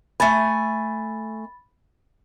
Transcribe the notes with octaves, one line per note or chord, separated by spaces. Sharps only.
A3 G#5 B5 A6